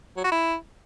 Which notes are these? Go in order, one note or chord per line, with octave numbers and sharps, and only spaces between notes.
F#3
F#4
E4